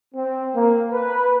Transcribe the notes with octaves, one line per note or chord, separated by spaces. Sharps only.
C4
A#3
B4